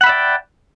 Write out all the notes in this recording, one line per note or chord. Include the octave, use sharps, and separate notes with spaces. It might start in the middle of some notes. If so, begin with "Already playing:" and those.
D5 E5 F#5 G5 B5